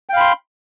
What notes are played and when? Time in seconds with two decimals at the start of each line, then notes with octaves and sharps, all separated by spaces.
0.09 G5
0.13 F5
0.17 B5
0.20 C6